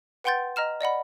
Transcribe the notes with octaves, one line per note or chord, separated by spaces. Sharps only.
B4 F#5 G5 C6 G6 A6
D#5 A#5 F6 E7
D5 D#5 F#5 B5